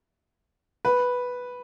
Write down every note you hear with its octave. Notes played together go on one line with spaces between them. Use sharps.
B4